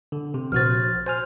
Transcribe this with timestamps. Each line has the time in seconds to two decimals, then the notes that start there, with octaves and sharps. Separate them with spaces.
0.12 D3
0.34 C3
0.52 A#1 F#4 C5 F6 A6
1.06 C5 G#5 F6